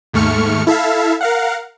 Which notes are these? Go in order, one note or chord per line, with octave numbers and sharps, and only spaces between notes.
D#2 G#2 A3 C#6 F6 C#7
E4 A4 E5 F5
A#4 F5 F#5